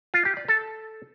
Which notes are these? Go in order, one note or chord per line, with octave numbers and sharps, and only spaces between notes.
F4
G4
D5
A4